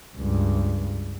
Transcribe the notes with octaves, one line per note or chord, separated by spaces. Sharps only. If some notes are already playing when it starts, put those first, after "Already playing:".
C#2 G2